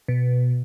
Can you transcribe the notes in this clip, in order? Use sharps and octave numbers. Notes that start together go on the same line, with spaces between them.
B2